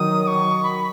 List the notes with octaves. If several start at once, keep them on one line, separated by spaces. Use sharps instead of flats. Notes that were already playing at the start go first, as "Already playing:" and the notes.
Already playing: D#3 F#3 D#6
D#6
C#6
B5